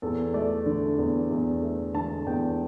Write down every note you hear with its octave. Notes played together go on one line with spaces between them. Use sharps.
E2 A4
A3 D5
D3
E2
E2
A3
D3 A5
E2 G5